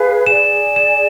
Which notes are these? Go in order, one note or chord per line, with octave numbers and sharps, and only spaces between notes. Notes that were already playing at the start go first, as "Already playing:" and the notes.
Already playing: G#4 B4 F5
G#4 D5 G#5 E7
E7